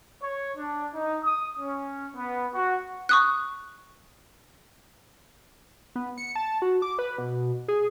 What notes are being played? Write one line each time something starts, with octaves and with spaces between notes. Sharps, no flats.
C#5
D4
D#4
D#6
C#4
B3
F#4
C#6 D#6 F#6
B3
C#7
A5
F#4
D6
B4
B2
G#4